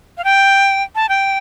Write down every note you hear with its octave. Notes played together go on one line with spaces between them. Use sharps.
F5
G5
A5
G5